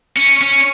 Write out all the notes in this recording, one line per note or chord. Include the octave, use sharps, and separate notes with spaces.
C#4
C#4